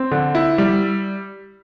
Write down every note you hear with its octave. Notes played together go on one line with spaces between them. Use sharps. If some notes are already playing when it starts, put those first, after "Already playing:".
Already playing: C4
D3
E4
G3